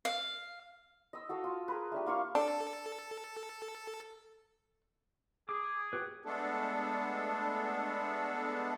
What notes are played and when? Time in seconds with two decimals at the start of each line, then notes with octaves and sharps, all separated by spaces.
0.05 F5
1.13 D#5 E6
1.29 F#4 A4 D#5 F5
1.44 F4
1.68 G#4 A#4 B4
1.92 A3 D4 G4
2.06 A#3 F4 F5 C#6
2.35 D4 A4
5.49 G#4 D6
5.93 F#4 G4 B4
6.25 G#3 A3 B3 D4 A4